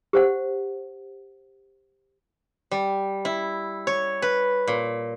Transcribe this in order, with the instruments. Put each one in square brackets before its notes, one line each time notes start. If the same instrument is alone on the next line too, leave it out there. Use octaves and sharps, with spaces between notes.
[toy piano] G4 C5 F#5
[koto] G3
E4
C#5
B4
A#2